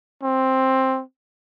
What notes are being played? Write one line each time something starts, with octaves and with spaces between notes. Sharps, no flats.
C4